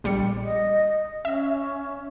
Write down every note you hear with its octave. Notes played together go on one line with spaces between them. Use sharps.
A#1 G3 C#7
D#5
C#4 E5